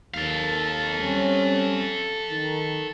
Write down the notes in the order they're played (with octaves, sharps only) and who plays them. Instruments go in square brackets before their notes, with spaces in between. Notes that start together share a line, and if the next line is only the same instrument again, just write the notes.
[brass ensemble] D#2 [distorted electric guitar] A4 F5
[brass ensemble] G3 C4 C#4
D#3